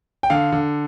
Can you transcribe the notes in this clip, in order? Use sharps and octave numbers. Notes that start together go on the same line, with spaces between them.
G5
D3 F5
D3